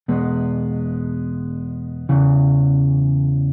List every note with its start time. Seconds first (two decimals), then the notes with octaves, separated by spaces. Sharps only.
0.08 E2 B2 G#3 B3
2.09 E2 C#3 E3